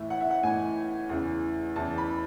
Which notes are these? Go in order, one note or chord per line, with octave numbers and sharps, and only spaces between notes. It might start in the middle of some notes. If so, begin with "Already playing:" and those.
Already playing: A2 E3 E5
F#5
E5
F#5
A2 E3 G#5
E2 C#3 E3
E2 C#3 E3 A5
B5